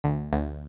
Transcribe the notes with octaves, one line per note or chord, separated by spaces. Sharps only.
D2
D2